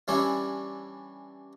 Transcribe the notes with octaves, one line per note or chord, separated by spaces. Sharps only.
E3 G3 C#4 D4 E4